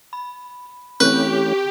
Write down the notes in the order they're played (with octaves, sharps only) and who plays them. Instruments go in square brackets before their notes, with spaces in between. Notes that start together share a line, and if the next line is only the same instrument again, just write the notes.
[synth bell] B5
[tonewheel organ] E3 A3 C#4 [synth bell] C4 C#6 G6 [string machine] G4 [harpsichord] B4